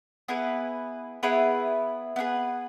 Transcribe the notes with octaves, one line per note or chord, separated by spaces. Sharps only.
B3 E4 G#4 B4
B3 E4 G#4 B4
B3 E4 G#4 B4